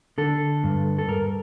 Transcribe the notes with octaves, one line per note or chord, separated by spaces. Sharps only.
D3 A4
G2
A4
G2 A#4